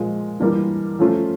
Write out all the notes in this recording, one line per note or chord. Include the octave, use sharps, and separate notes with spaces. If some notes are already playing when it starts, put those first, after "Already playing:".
Already playing: A#2 F3 G#3
E3 G3 A#3 D4 F4
F3 A3 C#4 F4